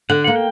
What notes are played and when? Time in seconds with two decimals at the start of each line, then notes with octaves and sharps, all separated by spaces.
0.10 D3 F#5
0.24 A#3 F#5
0.36 G5